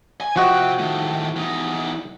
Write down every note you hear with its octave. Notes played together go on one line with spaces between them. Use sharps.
G#5
C3 F3 F#4 D#5 G5
A2 D#3
E2 D#4